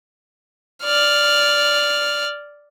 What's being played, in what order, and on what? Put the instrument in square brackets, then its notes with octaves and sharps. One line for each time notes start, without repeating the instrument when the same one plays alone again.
[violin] D5 F6